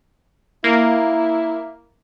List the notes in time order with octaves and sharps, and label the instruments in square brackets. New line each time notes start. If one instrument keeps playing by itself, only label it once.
[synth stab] A#3 [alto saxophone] E4